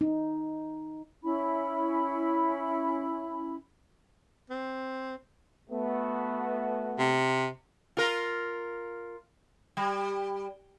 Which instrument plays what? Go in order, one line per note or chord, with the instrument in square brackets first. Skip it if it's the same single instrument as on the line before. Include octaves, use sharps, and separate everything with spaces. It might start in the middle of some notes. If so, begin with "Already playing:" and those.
[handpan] D#4
[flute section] C#4 E4 B5
[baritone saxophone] C4
[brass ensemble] A3 B3 F#4
[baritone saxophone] C3
[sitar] F4 A#4
G3